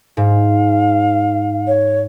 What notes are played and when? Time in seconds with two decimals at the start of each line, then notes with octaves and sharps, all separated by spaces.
0.17 G#2 F5
1.67 C#5